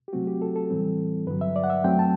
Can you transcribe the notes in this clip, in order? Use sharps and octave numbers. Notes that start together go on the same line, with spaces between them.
G4
C3 F#3 A3 C4 F#4
G4
A4
A4
A2 E3 G3 C4
G2 D3 F#3 B4
E5
D5
F#5
E5
F#2 F#3 A3 C4 G5
A5